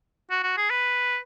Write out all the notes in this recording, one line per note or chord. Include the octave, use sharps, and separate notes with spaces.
F#4
F#4
G#4
B4